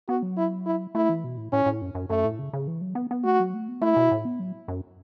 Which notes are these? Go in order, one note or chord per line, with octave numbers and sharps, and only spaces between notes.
B3 F#4
F#3
E4
E4
A3 E4
E3
B2
A2
A2 C#4
A2
F#2
F#2
F#2 A3
A2
C#3
C#3
E3
F#3
B3
B3
A3 F#4
F#3
A3
B3
A3 E4
B2
A2
B3
F#3
F#2